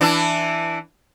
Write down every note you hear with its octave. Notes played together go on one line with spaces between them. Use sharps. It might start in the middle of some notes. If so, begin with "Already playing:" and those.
E3 D4 E4